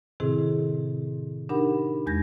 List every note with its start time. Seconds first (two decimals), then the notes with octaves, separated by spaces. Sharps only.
0.20 A2 C3 D#3 C4 E4 G#4
1.49 D4 D#4 G4 A#4 F#5 B5
2.06 E2 G#3 G6 G#6 A#6